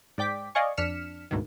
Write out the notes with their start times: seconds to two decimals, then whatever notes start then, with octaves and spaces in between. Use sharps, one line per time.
0.18 G#2 D5 G5 D6 B6
0.55 D5 D#5 F5 G#5 C#6
0.77 F2 D4 F6 B6 C#7 E7
1.31 D2 G#2 B2 D#3